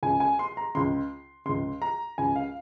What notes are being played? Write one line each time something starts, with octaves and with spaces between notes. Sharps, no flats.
C#2 C#3 G#5
G#5
C6
A#5
C#2 C#3 C6
C#2 C#3 C6
A#5
C#2 C#3 G#5
F5